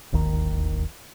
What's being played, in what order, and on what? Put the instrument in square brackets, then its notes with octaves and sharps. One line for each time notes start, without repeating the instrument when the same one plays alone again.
[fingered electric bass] D1 G#1 D#2 D#3